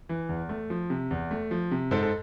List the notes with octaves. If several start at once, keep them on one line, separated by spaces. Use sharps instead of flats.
E3
E2
A3
F3
C3
E2
A3
F3
C3
G#2 A4 C5
A4